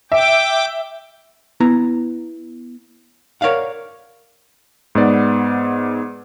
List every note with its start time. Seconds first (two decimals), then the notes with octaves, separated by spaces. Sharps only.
0.12 E5 G5 D6
1.60 B3 E4 A#5
3.41 A#4 C#5 D5 F5 F#5
4.95 G#2 B3 D5